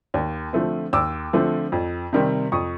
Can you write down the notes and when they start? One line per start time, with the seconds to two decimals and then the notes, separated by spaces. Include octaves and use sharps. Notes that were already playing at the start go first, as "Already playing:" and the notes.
0.14 D#2
0.53 D3 F3 A3 C4
0.93 D#2 D6 E6
1.33 D3 F3 A3 C4
1.72 F2
2.13 C3 D#3 G3 C4
2.52 F2 C#6 D#6